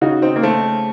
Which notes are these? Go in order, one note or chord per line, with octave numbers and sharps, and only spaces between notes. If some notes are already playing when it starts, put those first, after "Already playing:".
C#3 D#4 F#4
C4 D#4
A#3
A3 C4